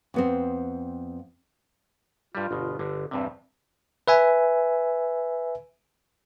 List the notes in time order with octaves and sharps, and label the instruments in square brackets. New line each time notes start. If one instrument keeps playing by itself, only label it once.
[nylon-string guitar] F2 B3 C4
[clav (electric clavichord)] G2 G3 [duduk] F4
[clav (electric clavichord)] G1 B2
G1 D3
[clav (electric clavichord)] E2 G2 C3 [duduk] C4
[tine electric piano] B4 E5 G#5